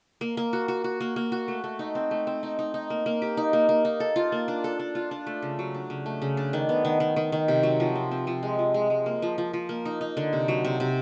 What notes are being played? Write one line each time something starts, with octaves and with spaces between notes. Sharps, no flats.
A#3
A#3
F#4
F#4
F#4
A#3
A#3
F#4
A3
A3
D#4
C4
A3
C4
D#4
D#4
D#4
A#3
A#3
G4
D#4
A#3
A#3
D#4
A4
F4
A#3
D4
A4
D4
F4
D4
A3
C#3
F#3
D4
C#3
A3
C#3
D4
D#3
B3
D#3
D#3
D#3
D#3
C3
F#3
F3
C4
C4
F3
G#3
F3
G#3
G#3
A#3
F3
F3
F3
A#3
D#4
D#4
D3
C3
F#3
C3
C3